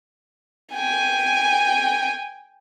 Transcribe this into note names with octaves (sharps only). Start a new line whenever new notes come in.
G5 G#5